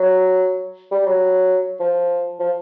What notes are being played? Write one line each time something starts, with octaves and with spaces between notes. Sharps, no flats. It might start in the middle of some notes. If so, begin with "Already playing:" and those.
Already playing: F#3
G3
F#3
F3
F3